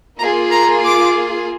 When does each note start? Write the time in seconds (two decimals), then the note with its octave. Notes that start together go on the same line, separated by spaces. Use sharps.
0.19 A#3 F4 G#4 A#5
0.52 A#5
0.84 D6